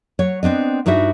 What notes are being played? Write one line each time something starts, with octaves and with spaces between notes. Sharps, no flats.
F#3 C#5
B3 C4 D4 D#5
G2 D#4 E4 F#4 E5